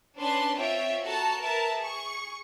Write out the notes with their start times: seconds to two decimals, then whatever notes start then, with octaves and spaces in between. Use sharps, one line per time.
0.18 C#4 D4 B4 A5 C6
0.57 C4 F4 C#5 E5 G5
1.03 F#4 A4 A5 A#5
1.39 A#4 B4 E5 A5 A#5
1.75 G#4 C#6